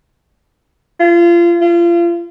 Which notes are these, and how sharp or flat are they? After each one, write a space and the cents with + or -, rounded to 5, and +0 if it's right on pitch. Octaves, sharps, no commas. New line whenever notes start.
F4 -30
F4 -35